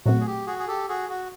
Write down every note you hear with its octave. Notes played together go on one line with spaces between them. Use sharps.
A#2 F#3 A3 C4 F#4
G#4
G4
F#4 G#4
G#4
G4 A4
F#4 G#4
F#4